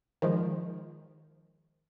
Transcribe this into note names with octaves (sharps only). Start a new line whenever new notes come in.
D#3 F3 G#3